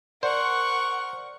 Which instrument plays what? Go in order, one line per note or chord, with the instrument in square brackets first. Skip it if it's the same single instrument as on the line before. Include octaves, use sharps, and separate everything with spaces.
[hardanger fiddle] A#4 C#6 [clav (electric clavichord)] C5 [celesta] D5 [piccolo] F#5